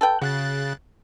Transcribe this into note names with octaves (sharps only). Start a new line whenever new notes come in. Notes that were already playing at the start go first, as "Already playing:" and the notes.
A4 B4 G5
C#3 F#4 F#6 A6